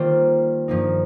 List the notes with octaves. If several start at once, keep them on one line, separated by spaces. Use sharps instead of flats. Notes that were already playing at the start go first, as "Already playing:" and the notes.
Already playing: D#3 G3 A#3 F4 C5
G2 F3 A#3 D#4